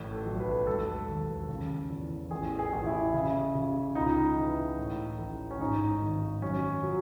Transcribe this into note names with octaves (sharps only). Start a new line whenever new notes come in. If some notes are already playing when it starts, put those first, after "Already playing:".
Already playing: A1 A2
A4
B1
B4
E1 A4
D#2
C#3
E2
A1 G#4
G#4
A1
E4
C#3
C#3
C#2 D#4
E3
A2
A1
C#4
G#2 D#4
G#1
F#2 C#4
F#3